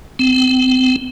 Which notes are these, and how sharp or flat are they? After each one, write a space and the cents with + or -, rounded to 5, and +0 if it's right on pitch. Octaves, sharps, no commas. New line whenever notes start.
C4 -30